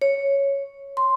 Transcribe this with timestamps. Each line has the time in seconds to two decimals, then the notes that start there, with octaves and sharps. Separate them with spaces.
0.02 C#5
0.97 C6